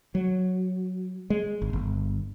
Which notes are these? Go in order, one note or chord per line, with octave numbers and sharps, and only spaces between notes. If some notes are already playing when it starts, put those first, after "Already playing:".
F#3
G#3
G#1
G1